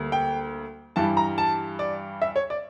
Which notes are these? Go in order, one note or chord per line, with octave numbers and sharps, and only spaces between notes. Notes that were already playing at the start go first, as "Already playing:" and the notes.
Already playing: D2 G3 A#3
G5
G2 E3 G3 A5
A#5
A5
D5
E5
C#5
D5